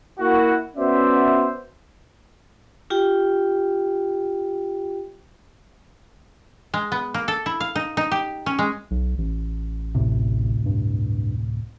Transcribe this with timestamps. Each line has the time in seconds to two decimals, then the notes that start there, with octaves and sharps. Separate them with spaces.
0.19 A#3 E4 F#4
0.76 B3 C#4 F#4 C5 D5 E5
2.90 F4 G4 G5
6.74 G#3
6.92 B3
7.14 A#3
7.28 A4
7.46 E4
7.60 F5
7.75 D#4
7.97 D#4
8.12 G4
8.46 C#4
8.59 G#3
8.91 B1
9.18 A1
9.95 D2 A2 C3
10.66 G2